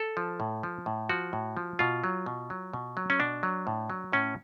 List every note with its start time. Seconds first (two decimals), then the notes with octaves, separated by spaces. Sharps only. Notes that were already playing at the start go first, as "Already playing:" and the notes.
Already playing: A4
0.17 F3
0.40 A2
0.63 F3
0.86 A2
1.09 F3 F#4
1.33 A2
1.57 F3
1.79 B2 F4
2.04 F#3
2.26 B2
2.50 F#3
2.73 B2
2.97 F#3
3.10 C#4
3.20 B2 D4
3.43 F#3
3.67 A2
3.90 F#3
4.12 A2 C#4